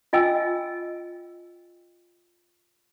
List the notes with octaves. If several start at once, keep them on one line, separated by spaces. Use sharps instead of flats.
F4 D#5 G5 G#5 E6